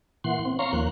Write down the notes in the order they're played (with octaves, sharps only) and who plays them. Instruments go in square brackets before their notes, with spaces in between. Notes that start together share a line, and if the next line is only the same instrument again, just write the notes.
[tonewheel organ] A#2 E3 F#5 C6
C4
C#5 F5 A#5 C6 C#6
D#2 F3 A#3 F#6